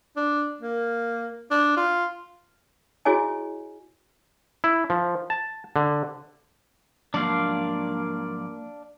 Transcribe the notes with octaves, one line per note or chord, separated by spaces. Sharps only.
D4
A#3
D4
F4
E4 F#4 G#4 C#5 D#5 G#5
E4
F3
A5
D3
G#2 F3 F#3 A#3 D4 D5 F5